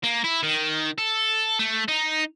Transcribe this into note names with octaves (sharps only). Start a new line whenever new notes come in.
A#3
E4
D#3
A4
A3
D#4